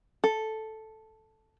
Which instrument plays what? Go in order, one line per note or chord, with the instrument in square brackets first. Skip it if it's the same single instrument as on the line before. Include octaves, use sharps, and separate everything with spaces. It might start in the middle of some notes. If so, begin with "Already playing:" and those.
[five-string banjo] A4